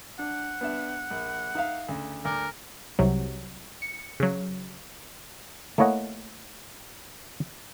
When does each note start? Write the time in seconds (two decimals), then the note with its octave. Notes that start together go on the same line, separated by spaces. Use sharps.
0.19 D4 F#5
0.61 B3 D4 E5
1.10 A#1
1.55 D#4 E5 F5
1.89 D2 C#3
2.25 D2 A#4 D6
2.99 C2 C3 F#3
3.82 C#7
4.20 C#3 F#3
5.78 A3 A#3 E4 C#5 D#5 F#5